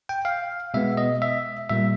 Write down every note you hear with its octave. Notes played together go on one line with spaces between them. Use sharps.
G5
F5
B2 G#3 B3 E5
D#5
E5
A#2 G3 A#3 E5